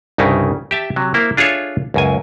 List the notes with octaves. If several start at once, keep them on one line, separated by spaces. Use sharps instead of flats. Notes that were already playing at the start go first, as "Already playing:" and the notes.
C2 G2 C#3 D#4 E4
G4 E5 A5
C3 F#3
A#3 E4 C5
D4 F4 G#4 A4 C#5 E5
C#2 F#2 G#5